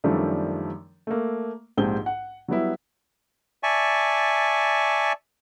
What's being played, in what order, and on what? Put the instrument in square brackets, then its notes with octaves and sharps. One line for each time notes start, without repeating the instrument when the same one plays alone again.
[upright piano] F#2 D#3 F3 G3 A3 D4
A3 A#3
A#1 G#2 C4 G4 G7
F#5
F#3 G3 B3 E4
[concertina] D5 E5 G#5 A5 C#6